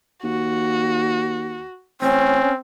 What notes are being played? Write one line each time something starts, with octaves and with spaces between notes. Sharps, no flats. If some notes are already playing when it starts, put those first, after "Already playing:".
D#2 F#4
A1 C4 C#4